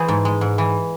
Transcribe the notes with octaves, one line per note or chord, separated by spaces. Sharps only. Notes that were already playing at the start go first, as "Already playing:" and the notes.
Already playing: E3 G#4 C5
G#2
G#3
G#2
E3